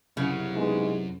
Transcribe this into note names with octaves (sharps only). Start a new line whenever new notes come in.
C2 F#2 C#3 F#4
G#3 B3 D#4